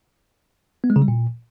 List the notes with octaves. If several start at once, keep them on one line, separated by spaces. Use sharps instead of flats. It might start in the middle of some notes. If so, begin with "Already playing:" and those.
B3
G#3
C#3
G3
A#2